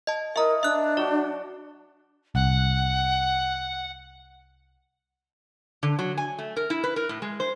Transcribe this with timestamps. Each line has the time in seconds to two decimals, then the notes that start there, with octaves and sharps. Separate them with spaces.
0.07 D#5 A5
0.36 E4 A#4 D#5 E5 A#5 C#6
0.63 D4 E5 F#6
0.97 F#3 F#4 D5 D6
2.35 C2 F#5
5.83 D3
5.99 F#3
6.18 G#5
6.38 A3
6.57 A#4
6.70 E4
6.84 B4
6.96 A#4
7.09 A2
7.22 G#3
7.40 C5